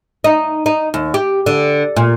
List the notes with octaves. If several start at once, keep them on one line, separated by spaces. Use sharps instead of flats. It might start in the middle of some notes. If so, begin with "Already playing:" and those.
D#4
D#4
D#2
G4
D3
A#2